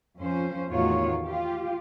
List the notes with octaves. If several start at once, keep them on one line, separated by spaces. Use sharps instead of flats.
F2 F3 C#4 C5
E2 A2 D#3 F4 F#4 C#5
F4 G4